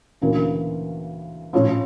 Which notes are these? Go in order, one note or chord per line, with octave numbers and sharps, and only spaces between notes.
D2 C#3 E3 A#3
A2 F3 C#4 F4 C#5